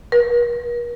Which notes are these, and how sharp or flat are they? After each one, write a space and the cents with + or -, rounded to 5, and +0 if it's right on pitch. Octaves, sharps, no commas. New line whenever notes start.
A#4 +45